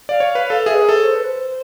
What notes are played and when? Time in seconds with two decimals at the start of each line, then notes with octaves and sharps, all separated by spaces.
0.09 D5 F5
0.20 C#5
0.35 B4
0.50 A4
0.66 G#4 E5
0.75 B4
0.81 A#4
0.89 A4
0.96 C#5
1.05 C5
1.15 B4
1.24 C5